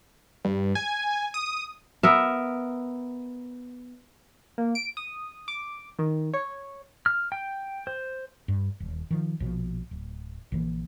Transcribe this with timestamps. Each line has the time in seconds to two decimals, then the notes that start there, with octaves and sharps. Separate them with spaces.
0.45 G2
0.75 G#5
1.34 D#6
2.03 B3 A#4 E5
4.58 A#3
4.75 D7
4.97 D#6
5.48 D6
5.99 D#3
6.34 C#5
7.06 F6
7.32 G5
7.87 C5
8.48 G2
8.80 D#1
9.11 D#3 F3
9.40 A#1 B2 F3
9.91 D1
10.52 A#1 D3 E3 A#3